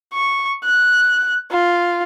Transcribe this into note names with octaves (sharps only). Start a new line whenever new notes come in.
C#6
F#6
F4